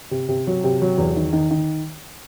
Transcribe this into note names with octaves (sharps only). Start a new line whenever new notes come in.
C3
C3
F#3
C3
F#3
E2
D#3
D#3
D#3